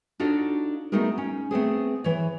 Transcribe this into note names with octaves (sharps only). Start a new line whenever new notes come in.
D4 D#4 F4 F#4 A4 C#5
A3 B3 D#4 F#4 G#4 A#4
C#4
A3 B3 C4 G#4
E3 C#5